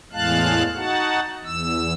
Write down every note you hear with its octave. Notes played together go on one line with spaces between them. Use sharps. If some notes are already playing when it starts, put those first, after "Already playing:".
E2 A2 G#3 F5 A5 F#6
D#4 F#4 F#5 A5
E2 E6